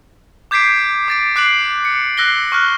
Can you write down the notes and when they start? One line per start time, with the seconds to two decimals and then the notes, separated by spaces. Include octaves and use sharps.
0.51 D6 G6 G#6 B6 C7 D7
1.08 D6 A6 D7
1.36 D6 F#6 C7 D7 F#7
1.85 C#7
2.17 E6 F#6 A#6 C7 G7
2.52 C#6 F6 F#6